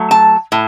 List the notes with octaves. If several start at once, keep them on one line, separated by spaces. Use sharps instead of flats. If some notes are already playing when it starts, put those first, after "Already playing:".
Already playing: F#3 A3
A5
A2